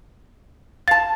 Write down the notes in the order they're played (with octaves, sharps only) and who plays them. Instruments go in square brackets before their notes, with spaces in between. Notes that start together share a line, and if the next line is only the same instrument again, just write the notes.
[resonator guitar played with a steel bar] F5 A5 [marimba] A6